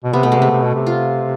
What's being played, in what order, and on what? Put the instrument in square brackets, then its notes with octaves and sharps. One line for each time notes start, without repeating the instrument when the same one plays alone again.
[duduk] B2
[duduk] C3 [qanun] B3
[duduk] B2 [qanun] A3
[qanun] G#3
[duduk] C3
[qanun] A3
[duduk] C3
B2
C3
[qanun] F4